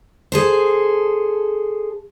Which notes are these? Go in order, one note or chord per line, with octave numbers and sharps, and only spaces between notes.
G#4 A4 C5